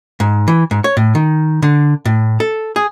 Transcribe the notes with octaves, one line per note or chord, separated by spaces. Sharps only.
G#2
E3
G#2
C#5
A2
D#3
D3
A2
A4
G#4